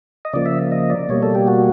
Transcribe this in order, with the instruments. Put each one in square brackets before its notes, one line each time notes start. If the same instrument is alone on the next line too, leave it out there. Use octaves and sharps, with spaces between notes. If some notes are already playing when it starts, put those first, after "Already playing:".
[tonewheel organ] D#5
C#3 F3 A#3 D5
E5
D#5
D5
B2 G3 A#3 C#5
A4
G4
F#4